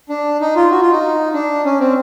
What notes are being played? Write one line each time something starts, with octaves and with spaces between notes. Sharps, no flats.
D4
D#4
F4
F#4
F4
D#4
D4
C#4
C4